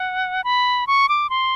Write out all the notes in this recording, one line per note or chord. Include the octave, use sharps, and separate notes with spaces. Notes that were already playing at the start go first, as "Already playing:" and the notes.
Already playing: F#5
B5
C#6
D6
C6